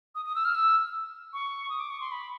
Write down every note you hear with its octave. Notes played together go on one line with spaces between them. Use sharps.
D#6
D#6
E6
F6
E6
C#6
D#6
D6
C#6
C6
B5